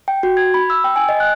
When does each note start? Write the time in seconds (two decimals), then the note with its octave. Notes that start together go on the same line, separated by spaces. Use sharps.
0.08 G5
0.23 F#4
0.37 G#6
0.54 B5
0.70 E6
0.84 G5
0.96 G#5
1.09 D#5
1.20 F#6